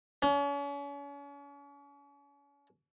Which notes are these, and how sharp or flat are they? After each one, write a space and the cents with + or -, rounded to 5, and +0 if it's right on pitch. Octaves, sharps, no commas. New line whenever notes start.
C#4 +40